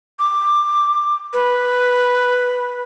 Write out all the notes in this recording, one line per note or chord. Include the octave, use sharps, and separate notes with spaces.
D6
B4